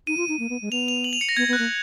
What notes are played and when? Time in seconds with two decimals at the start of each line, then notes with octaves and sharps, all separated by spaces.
0.07 D#4 D#7
0.17 F4
0.28 D#4
0.39 A#3
0.50 B3
0.62 G#3
0.71 B3 F7
0.88 F7
1.04 F#7
1.13 F7
1.21 C#7
1.29 A#6
1.37 B3 G#6
1.48 B3
1.53 F#6
1.59 A#3